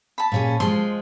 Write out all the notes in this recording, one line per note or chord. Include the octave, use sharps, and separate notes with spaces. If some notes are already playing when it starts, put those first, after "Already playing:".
A5 B5
A#2 C#4 G#4
F3 G#3 C6